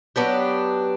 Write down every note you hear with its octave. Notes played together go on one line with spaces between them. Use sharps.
F#3 B3 D4 G4